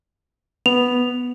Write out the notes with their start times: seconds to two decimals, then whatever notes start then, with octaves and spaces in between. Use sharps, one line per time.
0.66 B3 F7